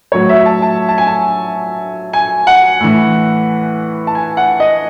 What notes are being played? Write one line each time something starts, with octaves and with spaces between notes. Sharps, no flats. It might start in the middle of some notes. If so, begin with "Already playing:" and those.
A2 F#3 C#5
E5
A5
A5
A5
G#5
A5
G#5
F#5
A2 E3
A5
G#5
F#5
D#5